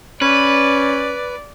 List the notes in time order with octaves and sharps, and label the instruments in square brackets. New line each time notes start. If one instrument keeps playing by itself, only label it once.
[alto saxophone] C#4 [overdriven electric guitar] B4 [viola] D5